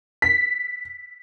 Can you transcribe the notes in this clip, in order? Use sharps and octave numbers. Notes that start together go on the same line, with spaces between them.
B6